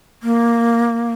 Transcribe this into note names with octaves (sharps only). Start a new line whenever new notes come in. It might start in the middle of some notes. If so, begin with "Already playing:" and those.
A#3